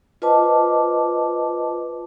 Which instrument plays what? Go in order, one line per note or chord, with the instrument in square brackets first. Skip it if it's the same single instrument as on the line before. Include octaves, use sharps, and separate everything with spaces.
[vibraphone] F4 B4 C5 D#5 A5 D6